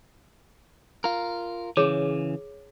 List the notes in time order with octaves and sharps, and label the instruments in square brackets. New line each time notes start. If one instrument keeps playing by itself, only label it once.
[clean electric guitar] F4 A#4
[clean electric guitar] C#3 E3 [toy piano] G#4 C#5 D6